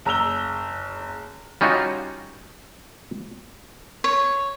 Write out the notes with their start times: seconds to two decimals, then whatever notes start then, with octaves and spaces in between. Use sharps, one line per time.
0.05 F#1 A#5 E6 F7 G7
1.61 G3 C#4 D#4 F4 F#4
4.04 C#5